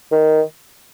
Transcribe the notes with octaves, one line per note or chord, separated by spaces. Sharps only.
D#3